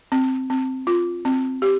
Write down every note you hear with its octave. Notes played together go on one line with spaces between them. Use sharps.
C4
C4
F4
C4
G4